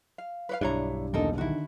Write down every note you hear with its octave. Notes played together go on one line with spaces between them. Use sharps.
F5
B4 C#5 F5
B1 G2 D4 E4 C#5 A#5
E1 D#2 D#4 A4 A#4
D3 D#3 E4 F#4